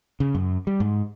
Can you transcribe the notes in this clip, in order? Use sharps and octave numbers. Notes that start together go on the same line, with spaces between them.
C#3
F#2
G3
G#2